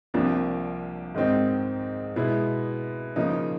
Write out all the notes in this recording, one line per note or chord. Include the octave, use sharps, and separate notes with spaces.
C2 C3 F3 A#3 D4
G#2 D#3 G#3 C4 D#4
B2 G#3 B3 E4
C#3 F3 A#3 D#4